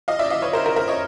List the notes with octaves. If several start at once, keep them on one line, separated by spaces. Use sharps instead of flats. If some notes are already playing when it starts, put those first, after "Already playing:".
D#5 F5
D5 E5
D#5 F5
B4 C#5
A#4 C5
A#4
A#4
C#5 D#5